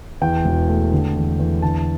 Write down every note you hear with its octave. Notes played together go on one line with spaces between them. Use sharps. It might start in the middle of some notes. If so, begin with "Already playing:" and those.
E2 G5
E1
A3
D3
E2
E2
D3 A5